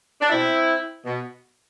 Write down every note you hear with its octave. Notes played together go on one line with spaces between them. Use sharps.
D4
B2 C4 E4
B2